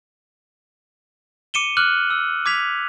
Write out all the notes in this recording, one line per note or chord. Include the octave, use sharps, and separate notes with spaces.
D6 C#7 D#7 E7 G7
D6 F6 F#6 F#7
E6
D6 G#6 B6 F7